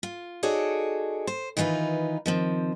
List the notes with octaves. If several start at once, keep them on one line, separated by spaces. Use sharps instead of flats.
F4
D#4 F#4 G#4 A4 C#5 D5
C5
D#3 E3 D#4 F4 B4
D#3 F3 C4